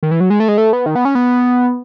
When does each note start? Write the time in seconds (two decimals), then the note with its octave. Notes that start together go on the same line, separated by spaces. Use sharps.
0.03 D#3
0.11 E3
0.20 F#3
0.30 G#3
0.40 A3
0.48 G#3
0.58 A3
0.73 B3
0.86 D#3
0.95 B3
1.05 C#4
1.15 B3